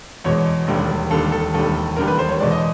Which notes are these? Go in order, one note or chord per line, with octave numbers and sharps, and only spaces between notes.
E2 B2 G#3 C#5
E1 D#2 D3 G3
E1 D#2 D3 G3 A4
A4
E1 D#2 D3 G3 A4
E1 D#2 D3 G3 A#4
B4
C5
C#5
E2 B2 G#3 D5
D#5